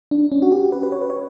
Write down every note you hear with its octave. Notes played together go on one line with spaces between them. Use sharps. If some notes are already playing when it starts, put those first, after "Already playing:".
D4
C#4
F#4
G4
B4
B4
C#5
B4
C#5